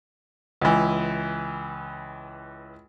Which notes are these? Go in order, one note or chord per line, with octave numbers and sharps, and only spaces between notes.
C#2 E3